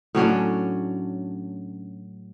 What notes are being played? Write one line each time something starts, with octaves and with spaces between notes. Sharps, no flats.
A2 F#3 C#4 D4